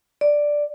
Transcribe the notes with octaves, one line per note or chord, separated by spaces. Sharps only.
D5